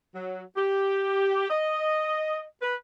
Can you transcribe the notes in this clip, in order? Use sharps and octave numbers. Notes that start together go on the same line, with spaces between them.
F#3
G4
D#5
B4